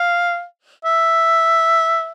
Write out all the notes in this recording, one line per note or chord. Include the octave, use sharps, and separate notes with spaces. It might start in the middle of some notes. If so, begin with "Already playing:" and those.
Already playing: F5
E5